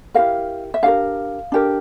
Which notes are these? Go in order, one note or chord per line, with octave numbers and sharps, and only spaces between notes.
E4 G4 A#4 F5
E5
D4 G4 A#4 F5
D4 G4 A#4